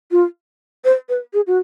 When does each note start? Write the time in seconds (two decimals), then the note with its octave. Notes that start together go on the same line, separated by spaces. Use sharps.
0.11 F4
0.85 C5
1.09 B4
1.34 G#4
1.47 F#4